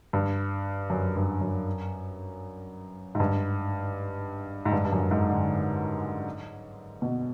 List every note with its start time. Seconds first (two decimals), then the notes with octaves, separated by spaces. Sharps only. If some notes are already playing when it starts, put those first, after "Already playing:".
0.13 G2
0.90 F#2
1.16 G2
1.41 F#2
3.15 G#2
3.20 G2
4.65 G#2
4.72 G2
4.85 G2
4.92 F#2
5.11 G#2
5.30 D3
7.02 B2